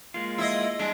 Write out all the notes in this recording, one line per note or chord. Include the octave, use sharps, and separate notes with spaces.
G#3 A#3 F4
E4 D#5
G3 G#3 D4